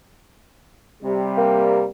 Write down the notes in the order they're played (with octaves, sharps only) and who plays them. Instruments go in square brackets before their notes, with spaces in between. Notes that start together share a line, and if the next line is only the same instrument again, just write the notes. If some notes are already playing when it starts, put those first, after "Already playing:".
[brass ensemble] C3 G3
[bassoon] A#3